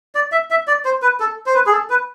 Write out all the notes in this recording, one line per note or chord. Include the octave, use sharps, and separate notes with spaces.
D5
E5
E5
D5
C5
B4
A4
C5
B4
G#4
A4
B4